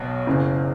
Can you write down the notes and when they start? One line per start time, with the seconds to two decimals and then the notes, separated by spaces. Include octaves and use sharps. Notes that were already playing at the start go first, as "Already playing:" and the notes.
Already playing: B1 B2 F#3
0.27 F#1 F#2 C#3 E3